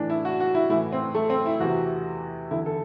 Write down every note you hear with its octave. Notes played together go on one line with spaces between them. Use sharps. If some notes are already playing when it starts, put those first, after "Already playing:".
Already playing: A2 E3 D4
E4
F#4
F#4
E4
A2 E3 E4
C4
A3
C4
E4
E2 C3 E3 F#4
E2 D3 E4
A4